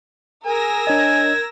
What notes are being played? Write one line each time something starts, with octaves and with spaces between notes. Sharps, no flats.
G#4 A#4 G#5 E6 A#6
D4 C#5 D#5 G#6